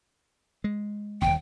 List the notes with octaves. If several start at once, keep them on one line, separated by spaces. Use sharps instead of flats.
G#3
D#1 G#1 D#2 G5